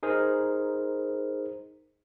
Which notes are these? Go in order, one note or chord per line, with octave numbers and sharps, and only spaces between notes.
D#4 G#4 A#4 C5